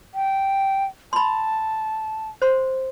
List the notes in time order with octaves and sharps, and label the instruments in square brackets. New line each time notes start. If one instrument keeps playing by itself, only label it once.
[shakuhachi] G5
[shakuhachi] A5 [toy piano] B5 C6
[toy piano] C5 C6